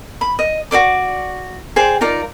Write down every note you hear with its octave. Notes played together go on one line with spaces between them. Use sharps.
B5
D#5
F#4 C5 D5 D6
G#4 C5 D5 G5
D#4 F4 A#4 D5